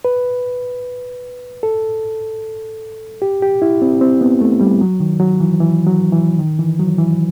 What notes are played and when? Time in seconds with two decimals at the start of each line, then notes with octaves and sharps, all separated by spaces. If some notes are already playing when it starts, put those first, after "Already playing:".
0.05 B4
1.63 A4
3.22 G4
3.42 G4
3.62 E4
3.82 C4
4.01 C4
4.21 B3
4.41 A3
4.61 G3
4.81 F#3
5.00 D#3
5.20 F#3
5.40 E3
5.61 E3
5.87 F#3
6.12 E3
6.39 D#3
6.59 E3
6.79 F#3
6.98 E3